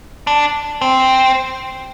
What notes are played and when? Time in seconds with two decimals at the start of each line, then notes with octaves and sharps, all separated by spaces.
0.27 D4
0.82 C4